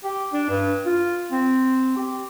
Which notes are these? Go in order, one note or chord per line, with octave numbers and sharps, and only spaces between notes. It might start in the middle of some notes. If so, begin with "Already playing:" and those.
G4
D4
G2
F4
C4
G4